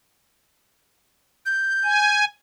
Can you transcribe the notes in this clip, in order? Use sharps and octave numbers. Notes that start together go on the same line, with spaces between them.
G6
G#5